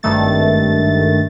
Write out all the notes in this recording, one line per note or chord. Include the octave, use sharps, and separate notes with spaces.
G#1 G2 D#3 A3 A6